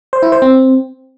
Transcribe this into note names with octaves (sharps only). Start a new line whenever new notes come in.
C5
E4
C5
C4